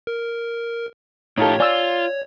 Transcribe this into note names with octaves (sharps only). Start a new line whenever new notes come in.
A#4
A2 D#4 F4 G4 A4 C#5
F4 D5 G#5 E6